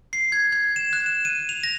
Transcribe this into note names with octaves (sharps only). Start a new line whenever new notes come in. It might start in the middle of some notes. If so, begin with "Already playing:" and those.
C7
G#6
G#6
E7
F#6
E7
D#7
F7
A#6